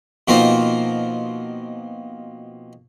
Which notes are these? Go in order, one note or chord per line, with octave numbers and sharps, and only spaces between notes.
B2 F3 A#3 C4 D#4 F4